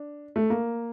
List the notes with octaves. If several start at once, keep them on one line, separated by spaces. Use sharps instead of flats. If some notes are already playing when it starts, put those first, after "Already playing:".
Already playing: D4
A3
A#3